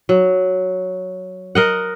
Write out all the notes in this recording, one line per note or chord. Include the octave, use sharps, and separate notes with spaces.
F#3
A#4 D#5 F#5